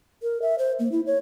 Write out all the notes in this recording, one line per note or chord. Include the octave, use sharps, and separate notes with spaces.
A#4
E5
C5
A#3
E4
C#5